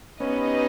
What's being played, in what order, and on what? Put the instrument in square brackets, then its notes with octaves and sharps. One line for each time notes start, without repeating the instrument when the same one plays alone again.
[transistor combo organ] B3 C#4 [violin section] D#4 G4 B4 D#5